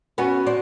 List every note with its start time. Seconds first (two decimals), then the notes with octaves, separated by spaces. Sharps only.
0.18 B3 C#4 F#4
0.46 C4 D4